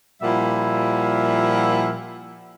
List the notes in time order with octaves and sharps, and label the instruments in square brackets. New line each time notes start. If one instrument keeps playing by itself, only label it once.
[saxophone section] A#2 F3 G3 E4 E5 F#5